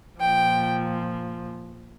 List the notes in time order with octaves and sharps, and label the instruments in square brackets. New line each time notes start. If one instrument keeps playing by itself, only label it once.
[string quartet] A#2 F3 G5